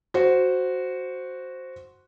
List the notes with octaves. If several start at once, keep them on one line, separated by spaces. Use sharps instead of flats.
F#4 C5